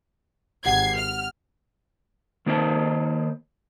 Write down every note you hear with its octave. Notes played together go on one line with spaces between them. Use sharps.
G#1 G4 F#5 G#6 C7
F6
D#3 A#3 C5 A5